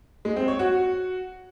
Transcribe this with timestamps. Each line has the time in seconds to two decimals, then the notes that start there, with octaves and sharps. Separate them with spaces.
0.25 G#3
0.36 C4
0.48 C#5
0.59 F#4